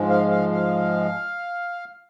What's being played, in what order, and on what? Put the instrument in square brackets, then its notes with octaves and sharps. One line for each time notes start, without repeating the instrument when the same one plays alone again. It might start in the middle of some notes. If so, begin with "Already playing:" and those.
Already playing: [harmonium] G#2 F3 G#3
F5
F5
F5